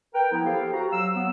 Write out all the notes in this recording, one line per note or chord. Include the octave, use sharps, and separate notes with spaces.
A#4 B4 G5
F3 B3 E4
G4 A4 C5 F5
F#4 A#5
F#3 F5 E6
F#3 B3